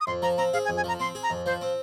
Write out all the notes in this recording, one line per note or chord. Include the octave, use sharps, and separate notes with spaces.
D#6
F2 C6
F3 A#5
C4 A#5
G#4 F5
G#5
F2
G#5
F3 A#5
C4 C6
G#4
A#5
F2
F3 C5
C4